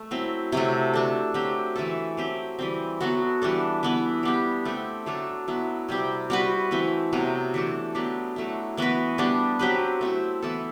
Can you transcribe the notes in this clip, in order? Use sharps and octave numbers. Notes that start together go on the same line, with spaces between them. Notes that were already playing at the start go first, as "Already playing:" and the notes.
Already playing: A3
F#3 C4 E4
C3 F#3 A3
A3 D4 A4
F#3 C4 G4
E3 A3 E4 A4
F#3 C4 G4
E3 G3 C4
F#3 B3 F#4 A4
E3 G3 D4 A4
E3 B3 E4
G3 B3 D4 G4
A3 C4 G4
F#3 A3 D4 A4
F#3 B3 E4
C3 G3 C4 G4
G3 C4 F#4 B4
E3 A3 C4 E4
C3 F#3 B3
E3 A3 D4 A4
F#3 B3 D4 G4
F#3 A3 E4
E3 B3 F#4 B4
G3 B3 D4 G4
F#3 C4 G4 B4
A3 C4 E4
E3 B3 E4 A4